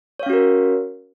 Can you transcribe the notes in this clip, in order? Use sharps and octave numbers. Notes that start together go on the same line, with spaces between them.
C#4 F#4 A#4 C#5 F5